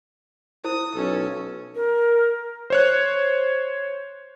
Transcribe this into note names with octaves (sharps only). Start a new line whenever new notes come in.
E4 C5 D#6
B1 C#4 A4
A#4
C5 C#5 F#6